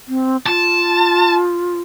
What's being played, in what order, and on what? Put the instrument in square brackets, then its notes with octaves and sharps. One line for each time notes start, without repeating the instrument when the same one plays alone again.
[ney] C4
[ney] F4 [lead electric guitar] A5